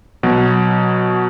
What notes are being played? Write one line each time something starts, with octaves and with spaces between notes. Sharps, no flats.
B2 F#3 F#4